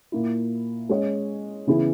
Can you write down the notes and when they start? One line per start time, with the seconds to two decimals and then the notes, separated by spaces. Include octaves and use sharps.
0.12 A#2 A#3 E4
0.89 G#3 C#4 G#4 C#5
1.67 C#3 E3 B3 E4 G#4